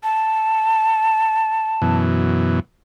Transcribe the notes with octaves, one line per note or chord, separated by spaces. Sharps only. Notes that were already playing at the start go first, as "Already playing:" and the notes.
A5
F#2 B2 E3